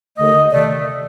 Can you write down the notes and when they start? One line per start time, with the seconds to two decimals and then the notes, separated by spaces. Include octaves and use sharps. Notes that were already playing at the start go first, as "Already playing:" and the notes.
0.18 D#2 D3 A3 D#5
0.51 C3 D#3 A3 D5